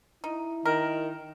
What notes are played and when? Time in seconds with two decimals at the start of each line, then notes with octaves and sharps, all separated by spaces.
0.24 D#4 E4
0.66 D#3 A#4